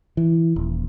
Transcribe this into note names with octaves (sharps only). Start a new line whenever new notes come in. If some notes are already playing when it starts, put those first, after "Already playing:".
E3
D#1